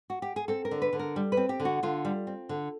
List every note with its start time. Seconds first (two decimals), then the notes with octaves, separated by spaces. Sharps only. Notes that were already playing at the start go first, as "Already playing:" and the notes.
0.10 F#4
0.22 G4
0.36 G#4
0.48 C4 A4
0.65 A#4
0.71 D3
0.82 B4
0.93 D3
0.99 A#4
1.16 G3
1.32 B4
1.37 C4
1.49 G4
1.60 D3
1.65 F#4
1.83 D3 F4
2.05 G3
2.27 C4
2.49 D3